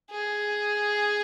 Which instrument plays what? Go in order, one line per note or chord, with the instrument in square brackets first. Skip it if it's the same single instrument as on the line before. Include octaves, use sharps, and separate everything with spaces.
[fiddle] G#4